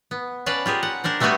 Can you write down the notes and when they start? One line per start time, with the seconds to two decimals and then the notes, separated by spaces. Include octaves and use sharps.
0.11 B3
0.46 C#4 B4 D5 F5 A5
0.66 F4 G4 G#4 A#4
0.83 F#5
1.04 D4 A#4 C5 D5
1.20 G3 A3 B3 F#4 G4 G#5